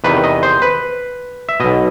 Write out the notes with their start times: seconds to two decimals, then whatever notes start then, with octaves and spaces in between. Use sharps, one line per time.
0.04 E2 C3 D#3 B4
0.24 D#5
0.43 C5
0.62 B4
1.49 E5
1.60 B1 B2 D#5